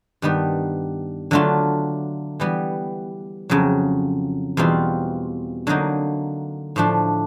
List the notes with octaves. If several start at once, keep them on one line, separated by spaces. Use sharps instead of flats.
G2 D#3 G3 B3
D3 F#3 A3 D4 F4
E3 G3 B3
F2 C#3 F#3
E2 B2 G3 C4 F4
D3 F#3 A#3 D#4
A2 F3 A3 D4